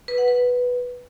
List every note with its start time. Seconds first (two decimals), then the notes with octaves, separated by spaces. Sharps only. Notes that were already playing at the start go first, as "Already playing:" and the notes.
0.08 B4
0.18 F#5
0.28 B4